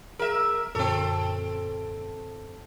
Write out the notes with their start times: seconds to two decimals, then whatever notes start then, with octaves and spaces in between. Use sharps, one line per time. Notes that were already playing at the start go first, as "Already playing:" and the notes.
0.19 G#4 A#4 E5
0.75 F#2 A#2 D3 C4 A4